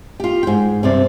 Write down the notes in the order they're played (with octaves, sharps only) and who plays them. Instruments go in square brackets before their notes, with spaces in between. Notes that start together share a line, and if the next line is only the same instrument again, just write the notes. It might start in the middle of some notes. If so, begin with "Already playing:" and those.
[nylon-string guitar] F4 G4
G#2 G5
G2 C3 C4 D5